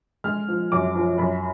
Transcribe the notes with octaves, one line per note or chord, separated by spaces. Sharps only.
G#3 F6
F3
F#2 D6
F3
F#2 B5